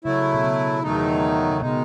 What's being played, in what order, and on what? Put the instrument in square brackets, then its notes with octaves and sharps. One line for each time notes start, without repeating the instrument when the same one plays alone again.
[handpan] C#3 [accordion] F#3 A3 E4
[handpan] B2
C#3
[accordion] E2 D#3 F#3 A3 D#4
[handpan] C#3
[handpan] B2 [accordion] D#3 G#3 D#4